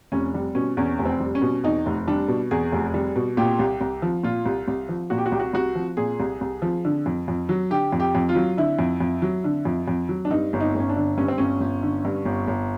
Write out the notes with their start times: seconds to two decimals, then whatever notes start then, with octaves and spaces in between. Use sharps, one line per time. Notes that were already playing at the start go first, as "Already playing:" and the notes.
0.12 F1 C#4
0.34 G3
0.55 B2 C#4
0.77 E2 C#4
0.99 F1
1.05 C4
1.20 G3
1.35 C#4
1.42 B2
1.64 E2 D#4
1.86 F1
2.07 G3 D4
2.28 B2
2.51 E2 G#4
2.72 F1
2.94 G3
3.16 B2
3.37 A#2 G4
3.59 C2
3.81 C2
4.02 F3
4.23 A#2 F4
4.46 C2
4.68 C2
4.89 F3
5.10 A#2 F#4
5.18 G4
5.26 F#4
5.32 C2 G4
5.40 F#4
5.53 C2 F#4
5.75 F3
5.97 A#2 G#4
6.20 C2
6.41 C2
6.62 F3
6.85 D3
7.06 F2
7.28 F2
7.49 F#3
7.70 D3 G4
7.93 F2
8.00 G4
8.15 F2
8.29 F4
8.35 F#3
8.57 D3 E4
8.79 F2
9.01 F2
9.22 F#3
9.44 D3
9.65 F2
9.88 F2
10.09 F#3
10.25 D4
10.31 G2 D#4
10.53 G1
10.60 D#4
10.75 G1 C#4
10.89 D4
10.96 D3
11.18 G2 C#4
11.28 C4
11.38 G1 C#4
11.60 G1
11.83 D3
12.05 G2
12.25 G1
12.48 G1